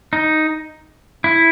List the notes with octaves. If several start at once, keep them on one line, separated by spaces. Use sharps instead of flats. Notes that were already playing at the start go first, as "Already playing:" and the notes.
D#4
E4